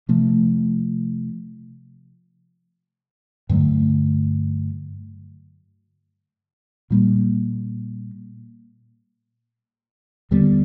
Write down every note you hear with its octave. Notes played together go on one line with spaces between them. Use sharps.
C3 F3 A3
G2 D3 F#3 A3
A#2 G3 A#3
D#2 D3 G3 B3